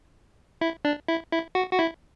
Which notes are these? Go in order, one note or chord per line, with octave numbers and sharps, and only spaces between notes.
E4
D4
E4
E4
F#4
F#4
E4